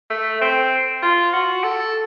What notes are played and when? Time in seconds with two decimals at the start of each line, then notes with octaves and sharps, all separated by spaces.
0.10 A3
0.41 C4
1.02 F4
1.33 F#4
1.63 A4